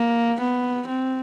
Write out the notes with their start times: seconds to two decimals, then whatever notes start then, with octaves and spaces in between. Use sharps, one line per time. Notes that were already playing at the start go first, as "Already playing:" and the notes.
Already playing: A#3
0.40 B3
0.87 C4